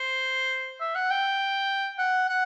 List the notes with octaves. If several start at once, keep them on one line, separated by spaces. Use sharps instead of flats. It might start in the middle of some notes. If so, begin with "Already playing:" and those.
Already playing: C5
E5
F#5
G5
F#5
F#5